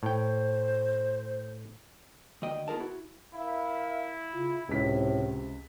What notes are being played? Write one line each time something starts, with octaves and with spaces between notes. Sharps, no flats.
A2 C5 G5
D2 D#3 D#5 G5
B3 F4 G#4 A#4 A5
E4 F#4
E4 A#4 E5 F5
C#3 F4
C#2 A2 C3 B6